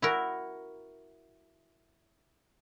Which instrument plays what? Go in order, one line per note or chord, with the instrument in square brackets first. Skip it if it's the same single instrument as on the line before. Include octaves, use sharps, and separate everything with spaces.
[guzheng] E4 F#4 A#4